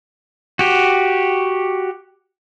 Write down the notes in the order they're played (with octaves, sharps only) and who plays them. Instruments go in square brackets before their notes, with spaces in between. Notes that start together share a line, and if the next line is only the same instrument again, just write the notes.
[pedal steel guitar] F#4 G4